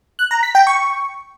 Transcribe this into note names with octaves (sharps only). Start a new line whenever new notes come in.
F#6
A#5
B6
G5
C#6